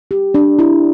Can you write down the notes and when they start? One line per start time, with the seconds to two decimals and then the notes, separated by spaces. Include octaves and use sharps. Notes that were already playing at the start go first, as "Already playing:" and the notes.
0.11 G4
0.34 D4
0.59 E4